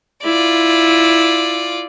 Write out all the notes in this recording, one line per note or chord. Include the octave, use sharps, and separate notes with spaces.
E4 F4 D5